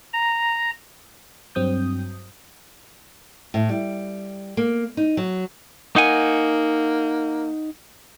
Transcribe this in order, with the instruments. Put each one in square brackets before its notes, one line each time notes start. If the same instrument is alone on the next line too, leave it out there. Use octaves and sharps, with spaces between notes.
[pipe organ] A#5
[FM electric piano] G2 F#3 C4 D#6 G6
[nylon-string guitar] A2
G3
A#3
D#4
F#3
[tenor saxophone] A#3 [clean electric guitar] D#4 F#5 G#5